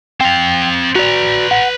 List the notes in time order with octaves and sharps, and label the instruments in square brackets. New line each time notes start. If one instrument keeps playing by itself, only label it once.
[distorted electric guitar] C4 F5 [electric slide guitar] G5
[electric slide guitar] F#4 D5 [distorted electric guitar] B4 A#5
[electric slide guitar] F#5